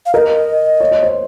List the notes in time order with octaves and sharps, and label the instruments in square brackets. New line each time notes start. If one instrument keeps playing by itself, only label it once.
[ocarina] F5
[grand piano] A#4 [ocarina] D#5
[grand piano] C#5
C#5
C5